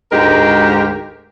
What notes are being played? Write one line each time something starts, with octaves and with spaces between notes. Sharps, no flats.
D2 G#2 G#3 G4 A#4